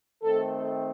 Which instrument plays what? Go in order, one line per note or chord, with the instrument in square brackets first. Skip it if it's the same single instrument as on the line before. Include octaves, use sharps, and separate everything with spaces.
[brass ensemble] D#3 A3 C4 A4